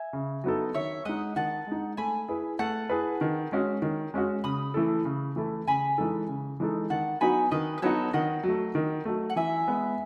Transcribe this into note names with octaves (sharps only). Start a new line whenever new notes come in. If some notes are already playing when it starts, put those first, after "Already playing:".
Already playing: E5 G#5
C#3
F#3 B3 D#4 A4
D#3 C#5 E5
G#3 D#4 D#5 F#5
D#3 F#5 A5
G#3 D#4
A3 G#5 B5
E4 G#4 B4
A3 F#5 A5
E4 G#4 B4
D#3
G#3 C#4 F#4
D#3
G#3 C#4 F#4
C#3 B5 D#6
E3 A3 E4 A4
C#3
E3 A3 E4 A4
C#3 G#5 B5
E3 G#3 D#4 A4
C#3
E3 G#3 D#4 A4
D#3 F#5 A5
F#3 B3 D#4 F#4 G#5 B5
D#3 B4 D#5
B4
F#3 B3 D#4 F#4 A4 C#5
D#3 D#5 F#5
F#3 A3
D#3
F#3 A3
F#5
E3 E5 G#5
G#3 B3